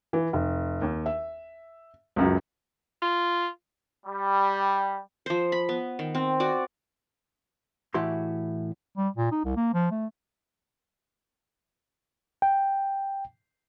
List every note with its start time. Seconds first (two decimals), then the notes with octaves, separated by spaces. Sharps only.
0.13 E3
0.33 F1
0.82 D#2
1.06 E5
2.16 C#2 F#2 F#3
3.02 F4
4.06 G3
5.26 F3 C5
5.52 B5
5.69 B3
5.99 D#3
6.15 C4
6.40 F#4 D5
7.94 A2 E3 E4 F#4 G4 C6
8.97 G3
9.16 A#2
9.32 D#4
9.45 C2
9.56 A#3
9.74 F3
9.91 A3
12.42 G5